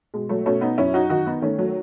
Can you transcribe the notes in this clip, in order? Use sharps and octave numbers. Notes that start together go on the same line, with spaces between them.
B2 G#3
F#3 A3
B2 A3 C#4
B3 D#4
F#2 C#4 E4
D#4 F#4
D#3 D#4 F#4
B3 D#4
D#3 A3 C#4
F#3 A3